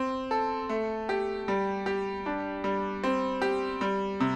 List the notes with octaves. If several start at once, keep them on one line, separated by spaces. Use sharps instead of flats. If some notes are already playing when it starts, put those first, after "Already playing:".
Already playing: C4
A4
A3
G4
G3
G4
D4
G3
C4
G4
G3
C3